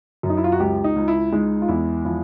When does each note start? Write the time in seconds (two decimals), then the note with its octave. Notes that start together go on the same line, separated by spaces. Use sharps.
0.23 F#2
0.30 D#4
0.37 E4
0.44 F4
0.52 F#4
0.60 C#2 G4
0.84 D#4
0.96 C#2
1.08 E4
1.32 G#3 D#4
1.62 F4
1.68 E2 E4
2.05 F3 E4